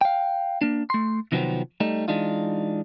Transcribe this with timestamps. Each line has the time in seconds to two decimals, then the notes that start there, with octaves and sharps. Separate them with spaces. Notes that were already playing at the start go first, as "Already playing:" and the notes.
0.01 F5 G5
0.61 A#3 D4
0.90 A3 C6
1.32 C3 D#3 F3 F#3 B3 C4
1.80 G3 A3 D#4
2.08 E3 G#3 D4 D#4 F4